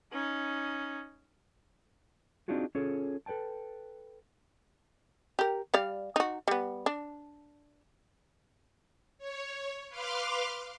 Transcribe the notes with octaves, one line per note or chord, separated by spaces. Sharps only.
C#4 D#4
C4 D4 D#4 F4 F#4 G#4
C#4 F4 G#4 A4 C#5
A4 B4 C5 G5 A5
G4 A#4
G3 D5 F5
D#4 F#4
G3 B3
D4
C#5
B4 F5 C6 D6 F6